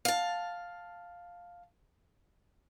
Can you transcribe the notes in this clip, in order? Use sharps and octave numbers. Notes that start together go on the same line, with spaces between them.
F5 A5